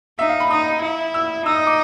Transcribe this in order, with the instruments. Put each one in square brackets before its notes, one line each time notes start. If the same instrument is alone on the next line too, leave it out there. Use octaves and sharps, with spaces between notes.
[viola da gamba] D#4 [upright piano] E5
[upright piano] F5
B5
[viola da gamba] D#4 [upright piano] D#6
[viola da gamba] E4
[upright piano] E6
[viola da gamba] D#4 [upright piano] E6
[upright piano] D#6
D6